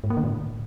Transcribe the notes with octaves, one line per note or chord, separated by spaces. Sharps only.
G#2
A#3
D3
A2